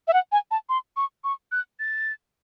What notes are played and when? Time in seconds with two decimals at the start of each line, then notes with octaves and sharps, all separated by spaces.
0.08 E5
0.13 F#5
0.32 G#5
0.51 A5
0.69 C6
0.97 C#6
1.24 C#6
1.52 F#6
1.80 A6